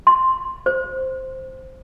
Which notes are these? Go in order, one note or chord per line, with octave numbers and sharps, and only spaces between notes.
C6
C5